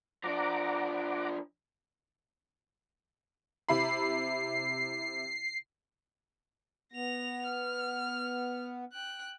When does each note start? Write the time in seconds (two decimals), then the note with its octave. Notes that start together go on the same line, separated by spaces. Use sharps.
0.24 F3 D4 F#5 A#5 D6
3.69 C3 E4 B5 C7
6.93 B3 A#6 F7
7.46 F6
8.92 G5 F#6